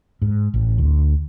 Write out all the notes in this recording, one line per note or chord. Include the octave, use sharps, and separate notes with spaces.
G#2
A1
D2